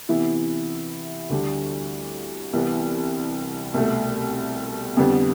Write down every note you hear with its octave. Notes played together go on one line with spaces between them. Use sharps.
C3 E3 B3 E4
D2 D3 G3 D4
C2 C3 E3 B3
C2 B2 A3
F2 D3 G3 B3